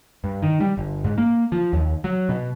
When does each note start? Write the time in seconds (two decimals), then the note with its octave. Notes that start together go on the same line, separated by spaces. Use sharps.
0.24 G2
0.43 D#3
0.60 G3
0.77 G1
1.04 G#2
1.18 A#3
1.52 F3
1.73 D#2
2.04 F#3
2.29 B2